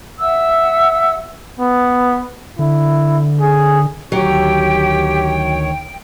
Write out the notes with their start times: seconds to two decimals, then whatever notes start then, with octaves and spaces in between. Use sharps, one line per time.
0.20 E5 F#5 E6
1.59 B3
2.59 D3 E4
3.41 G#4
4.12 D2 D#3 F#3 G4 C#5 G5